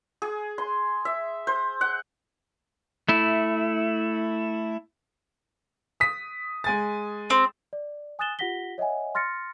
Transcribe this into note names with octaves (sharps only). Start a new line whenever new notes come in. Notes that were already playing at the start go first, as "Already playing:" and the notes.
G#4
C6
E5
C5
F#5
A3 E4
D#6 B6
G#3 G#5 A6
C4
D5
G#5 D#6 F#6 A6 E7 G7
F4 G4 F#5 A#6 B6 G7
C#5 D#5 E5 F#5 G#5
C6 F6 A6 A#6 C#7